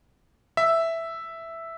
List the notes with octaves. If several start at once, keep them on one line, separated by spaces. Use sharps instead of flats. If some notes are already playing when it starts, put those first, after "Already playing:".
E5